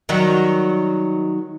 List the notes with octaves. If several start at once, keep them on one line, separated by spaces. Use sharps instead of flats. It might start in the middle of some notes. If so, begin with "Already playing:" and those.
D#3 F#3 G3